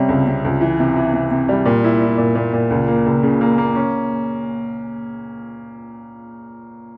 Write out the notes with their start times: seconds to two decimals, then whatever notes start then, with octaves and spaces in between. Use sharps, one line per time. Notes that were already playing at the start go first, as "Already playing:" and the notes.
Already playing: C3 G3 C#4
0.09 C#2
0.27 C3
0.44 C#2
0.61 E3
0.79 C3
0.96 E3
1.13 C3
1.31 C3
1.49 G3
1.65 A#2
1.84 E4
2.02 E4
2.18 A#2
2.35 A#2
2.53 A#2
2.70 C#2
2.88 A#3
3.06 C#2
3.23 C#3
3.41 A#3
3.58 A#3
3.76 C#4